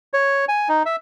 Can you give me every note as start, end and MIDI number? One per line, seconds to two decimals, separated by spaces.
0.13 0.45 73
0.49 0.68 80
0.69 0.83 63
0.86 0.96 76